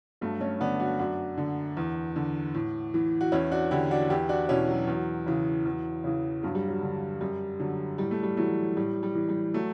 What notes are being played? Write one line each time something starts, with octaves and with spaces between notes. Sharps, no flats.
G2 F#3 A3
A3 C#4
D3 B3 D4
D4 F#4
F#2 D4 F#4
D3
E2
D3
A2
E3
F#4
E2 C#4 E4
D4 F#4
D3 E4 G4
D4 F#4
E2 E4 G4
D4 F#4
B2 C#4 E4
F#3
E2
C#3 E3
E2
C#3 E3
G2 F#3
G3
F#3
D3
F#2 G3
D3 F#3
A2 G3
A3
G3
E3 F#3 A3
A2 G3
G3
E3
G3
F#3 A3